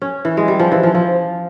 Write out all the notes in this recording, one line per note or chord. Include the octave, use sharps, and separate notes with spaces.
C#4
E3
G#3
G3
F3
E3
F3
F3